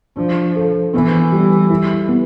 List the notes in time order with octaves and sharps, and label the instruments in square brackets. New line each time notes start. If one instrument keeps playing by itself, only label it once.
[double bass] F3 [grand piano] D4
[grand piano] A4
[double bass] E3 [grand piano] B3
[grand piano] G3
E4
B3